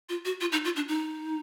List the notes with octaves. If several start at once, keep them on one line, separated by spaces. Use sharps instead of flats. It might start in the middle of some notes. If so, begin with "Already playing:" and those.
F4
F#4
F4
D#4
F4
D4
D#4